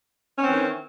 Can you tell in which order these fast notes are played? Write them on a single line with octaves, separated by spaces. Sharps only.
C#4 C4 E3 D#3